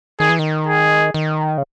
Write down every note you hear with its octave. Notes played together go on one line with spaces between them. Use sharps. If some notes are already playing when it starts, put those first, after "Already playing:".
D#3 G#4
E3
D#3
G#4
D#3
C#3